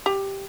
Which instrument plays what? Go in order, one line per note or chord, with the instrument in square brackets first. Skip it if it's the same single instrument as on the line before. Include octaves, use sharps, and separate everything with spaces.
[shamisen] G4